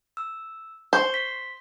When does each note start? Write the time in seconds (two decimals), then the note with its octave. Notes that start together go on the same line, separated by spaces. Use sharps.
0.17 E6
0.93 C5 C#6 C7
1.14 B6